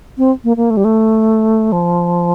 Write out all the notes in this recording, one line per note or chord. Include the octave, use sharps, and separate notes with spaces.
C4
A#3
A#3
A3
G3
A3
F3